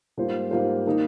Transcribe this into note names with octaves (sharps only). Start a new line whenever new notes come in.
G#2 G3 A#3 F4 C5
G#2 G3 A#3 F4 C5
D#3 A#3 D#4